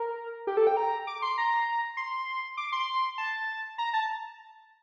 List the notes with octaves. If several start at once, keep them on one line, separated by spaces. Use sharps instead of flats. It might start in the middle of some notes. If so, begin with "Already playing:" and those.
Already playing: A#4
G4
A4
G5
A#5
D6
C6
A#5
C6
D6
C6
A5
A#5
A5